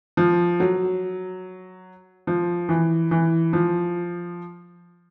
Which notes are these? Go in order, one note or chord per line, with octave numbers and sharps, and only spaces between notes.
F3
F#3
F3
E3
E3
F3